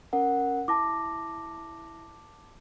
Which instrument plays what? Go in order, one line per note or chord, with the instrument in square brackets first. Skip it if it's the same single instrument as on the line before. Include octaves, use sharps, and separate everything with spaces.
[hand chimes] C#4 A#4 F#5
[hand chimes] E4 A#6 [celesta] A5 D6